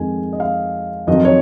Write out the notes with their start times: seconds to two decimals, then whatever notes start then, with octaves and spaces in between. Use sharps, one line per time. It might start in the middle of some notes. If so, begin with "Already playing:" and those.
Already playing: F2 D#3 G#3 G#5
0.33 D#5
0.40 F5
1.07 F2 D#3 F#3 D#5
1.25 C#5